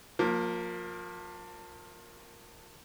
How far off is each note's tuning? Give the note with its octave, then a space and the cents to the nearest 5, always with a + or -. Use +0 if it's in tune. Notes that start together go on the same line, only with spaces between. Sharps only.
F3 +35 A#3 +0